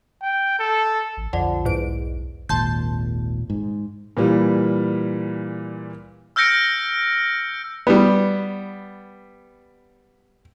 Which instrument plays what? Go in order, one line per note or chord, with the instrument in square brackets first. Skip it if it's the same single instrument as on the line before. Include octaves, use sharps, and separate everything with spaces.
[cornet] G5
A4
[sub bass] A1
[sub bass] B1 [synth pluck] F2 D3
[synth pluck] E2 G#2 D7
[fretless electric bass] G#1 D#2 [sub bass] A#2 [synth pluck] A5 C6 G6
[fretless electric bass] G#2
[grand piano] A#2 E3 G3
[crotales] E6 F6 G6 A#6 C#7 D7
[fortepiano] G3 B3